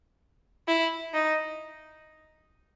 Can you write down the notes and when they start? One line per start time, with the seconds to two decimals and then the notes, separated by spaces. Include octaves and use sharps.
0.68 E4
1.14 D#4